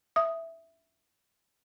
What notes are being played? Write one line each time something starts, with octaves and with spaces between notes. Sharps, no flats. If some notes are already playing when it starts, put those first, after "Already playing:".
E5 D#6